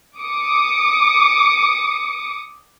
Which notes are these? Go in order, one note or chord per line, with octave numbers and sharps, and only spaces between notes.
D6 D#6 C#7